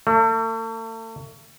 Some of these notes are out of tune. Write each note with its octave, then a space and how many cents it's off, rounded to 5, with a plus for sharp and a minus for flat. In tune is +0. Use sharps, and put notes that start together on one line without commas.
A3 +40